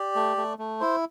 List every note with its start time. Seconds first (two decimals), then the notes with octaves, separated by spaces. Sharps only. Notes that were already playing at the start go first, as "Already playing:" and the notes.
Already playing: G4 D5
0.15 A3
0.37 A3
0.59 A3
0.81 E4 C5